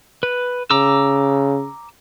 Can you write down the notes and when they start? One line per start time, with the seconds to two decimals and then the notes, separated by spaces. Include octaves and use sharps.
0.23 B4
0.70 C#3 A#5 D6 E6